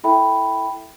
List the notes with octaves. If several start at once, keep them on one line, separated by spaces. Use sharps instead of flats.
E4 A4 E5 G5 B5